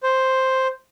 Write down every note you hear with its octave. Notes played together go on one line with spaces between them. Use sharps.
C5